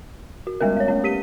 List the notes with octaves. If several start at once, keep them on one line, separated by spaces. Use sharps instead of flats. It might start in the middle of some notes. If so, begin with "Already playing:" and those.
F#4
G3 G#3 B3 C#4 A#4
G#3 C#5
A3 C#4
G4 B6 D#7